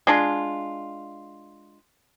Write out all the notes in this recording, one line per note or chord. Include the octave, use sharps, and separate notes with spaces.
G#3 D4 F4